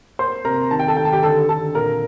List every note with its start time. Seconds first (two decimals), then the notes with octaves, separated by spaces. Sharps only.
0.19 A#3 C5 C6
0.45 C3 A#4 A#5
0.71 D#3 A5
0.79 G5
0.88 A4 A5
0.97 D#3 G5
1.05 A5
1.13 G4 G5
1.23 D3 A4 A5
1.49 D3 A4 A5
1.75 A#2 A#4 A#5